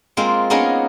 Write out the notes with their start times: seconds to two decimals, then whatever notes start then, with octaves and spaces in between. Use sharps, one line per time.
0.17 G#3 A#3 C4 F4
0.50 A#3 B3 C#4 D#4 G#4 A#4